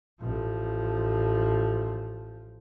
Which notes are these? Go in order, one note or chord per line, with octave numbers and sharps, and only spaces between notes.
A1 F3